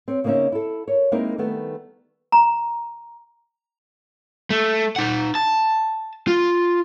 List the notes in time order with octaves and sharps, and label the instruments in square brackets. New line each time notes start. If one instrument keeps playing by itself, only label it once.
[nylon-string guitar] C4 C#5
C#3 A#3 C4 C#4 D#4 E5
E4 A4
A#4 C#5
G#3 A#3 C4 D#4 E4 A#4
D#3 G3 A3 B3
[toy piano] A#5
[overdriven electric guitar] A3
D#4 F#5
A5
F4